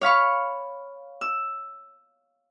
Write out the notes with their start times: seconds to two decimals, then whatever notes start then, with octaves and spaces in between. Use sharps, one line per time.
0.01 C#5 F5 B5 C#6
1.21 E6